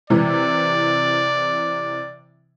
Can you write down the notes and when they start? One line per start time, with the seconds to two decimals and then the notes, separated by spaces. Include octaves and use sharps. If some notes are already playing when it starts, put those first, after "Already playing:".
0.10 C3 E3 D5